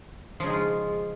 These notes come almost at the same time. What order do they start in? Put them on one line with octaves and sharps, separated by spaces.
F3 C#3 D#4 G#3 F4